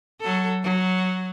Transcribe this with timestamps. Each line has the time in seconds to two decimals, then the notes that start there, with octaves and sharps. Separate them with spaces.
0.20 F#3 A4
0.63 F#3